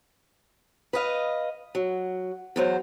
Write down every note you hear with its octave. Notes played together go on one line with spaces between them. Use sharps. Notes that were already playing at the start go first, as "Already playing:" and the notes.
B4 D#5 F5
F#3
E2 F#3 C5